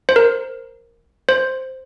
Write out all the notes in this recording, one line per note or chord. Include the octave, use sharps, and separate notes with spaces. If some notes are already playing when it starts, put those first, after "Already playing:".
C5
A#4
C5